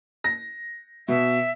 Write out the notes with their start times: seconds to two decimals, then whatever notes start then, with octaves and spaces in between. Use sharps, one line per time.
0.24 A#6
1.08 B2 E5